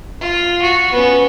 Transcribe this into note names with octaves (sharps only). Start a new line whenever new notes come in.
F4
F#4
B3 C#4